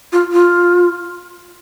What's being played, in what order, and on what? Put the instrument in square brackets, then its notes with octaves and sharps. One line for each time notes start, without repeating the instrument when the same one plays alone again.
[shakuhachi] F4
F4